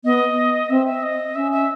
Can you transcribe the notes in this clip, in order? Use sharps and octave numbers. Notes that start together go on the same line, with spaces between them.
B3 D#5
C4 E5
E5
D#5
C#4 E5
E5